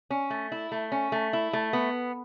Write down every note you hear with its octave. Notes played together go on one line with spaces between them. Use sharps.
C#4
A3
E4
A3
C#4
A3
E4
A3
B3